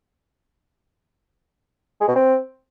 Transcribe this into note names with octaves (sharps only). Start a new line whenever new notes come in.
G#3
B2
C4